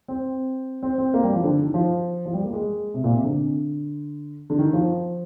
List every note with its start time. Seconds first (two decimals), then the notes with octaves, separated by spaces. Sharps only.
0.08 C4
0.83 C4
0.98 C4
1.14 A#3
1.24 G3
1.33 F3
1.43 D3
1.64 D#3
1.74 F3
2.26 F3
2.33 G3
2.44 A#3
2.53 G#3
2.94 C3
3.04 A#2
3.13 C3
3.24 D3
4.50 D3
4.59 D#3
4.73 F3